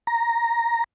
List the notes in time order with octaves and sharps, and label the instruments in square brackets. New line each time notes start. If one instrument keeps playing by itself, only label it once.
[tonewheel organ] A#5